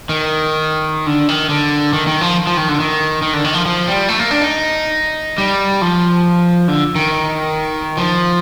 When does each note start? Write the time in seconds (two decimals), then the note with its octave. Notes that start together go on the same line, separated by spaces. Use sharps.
0.09 D#3
1.07 D3
1.29 D#3
1.49 D3
1.93 D#3
2.07 D#3
2.21 F3
2.47 F3
2.57 D#3
2.69 D3
2.80 D#3
3.22 D#3
3.33 D3
3.44 D#3
3.54 F3
3.66 F3
3.87 G3
4.09 A3
4.19 A#3
4.31 D4
4.41 D#4
5.38 G3
5.82 F3
6.68 D3
6.96 D#3
7.97 F3